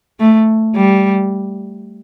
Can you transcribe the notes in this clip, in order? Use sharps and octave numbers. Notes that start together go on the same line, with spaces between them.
A3
G3